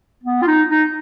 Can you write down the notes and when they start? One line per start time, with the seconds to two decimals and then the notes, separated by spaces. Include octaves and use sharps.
0.24 B3
0.42 F4
0.47 D#4
0.69 D#4